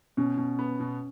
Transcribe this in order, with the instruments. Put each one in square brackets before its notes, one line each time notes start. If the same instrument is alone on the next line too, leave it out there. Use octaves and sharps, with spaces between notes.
[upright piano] B2 [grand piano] C#4
[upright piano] B2
B3
B2